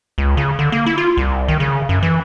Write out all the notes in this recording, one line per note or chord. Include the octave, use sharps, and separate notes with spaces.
C#2
C#3
D3
A#3
E4
F4
C2
D#3
C#3
F#2
E3